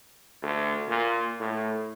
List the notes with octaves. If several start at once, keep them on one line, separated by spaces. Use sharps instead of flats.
D2
A#2
A2